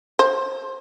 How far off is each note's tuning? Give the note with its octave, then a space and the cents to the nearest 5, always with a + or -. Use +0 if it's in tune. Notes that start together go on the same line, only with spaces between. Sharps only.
C5 +25